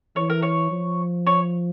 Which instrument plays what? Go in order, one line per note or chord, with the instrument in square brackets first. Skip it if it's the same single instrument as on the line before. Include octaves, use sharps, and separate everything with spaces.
[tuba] E3 [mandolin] C#5
[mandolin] A#4
C#5
[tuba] F3
[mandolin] C#5